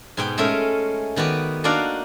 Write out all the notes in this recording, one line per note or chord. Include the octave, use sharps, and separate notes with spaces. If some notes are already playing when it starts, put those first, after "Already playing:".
G#2 B2 G5
G#3 A3 C#4 A#4 E5
D#3 B3 F#4 D5
A#3 D4 D#4 F#4 D5 F5